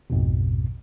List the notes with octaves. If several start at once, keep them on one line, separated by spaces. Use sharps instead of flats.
A#1 F2 G#2 B2